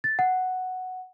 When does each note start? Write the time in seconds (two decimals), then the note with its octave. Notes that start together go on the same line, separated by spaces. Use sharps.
0.04 A6
0.19 F#5